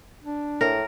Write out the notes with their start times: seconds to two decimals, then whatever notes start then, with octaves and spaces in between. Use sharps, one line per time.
0.23 D4
0.61 A2 A#4